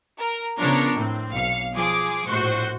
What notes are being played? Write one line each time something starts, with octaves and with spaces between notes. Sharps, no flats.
A#4
C#3 F3 B3 D4 A#4 C#5
A2 C4
B1 F5 C#7
F3 G#4 D6
A#1 A2 F#4 C5 C#6